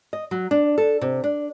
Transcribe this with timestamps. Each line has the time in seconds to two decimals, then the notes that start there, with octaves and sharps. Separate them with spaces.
0.13 D#5
0.31 F#3
0.51 D4
0.78 A4
1.01 C3
1.24 D4